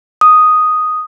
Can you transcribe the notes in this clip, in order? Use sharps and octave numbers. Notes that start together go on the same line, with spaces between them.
D#6